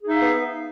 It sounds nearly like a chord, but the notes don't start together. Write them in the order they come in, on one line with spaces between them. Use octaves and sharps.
G#4 D#4 E5 F5 B3